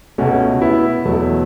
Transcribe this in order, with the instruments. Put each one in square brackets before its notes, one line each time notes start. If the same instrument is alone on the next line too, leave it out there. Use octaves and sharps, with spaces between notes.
[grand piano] C#2 B2 A3 C#4 F#4
B3 E4
E2 B2 F#3 A3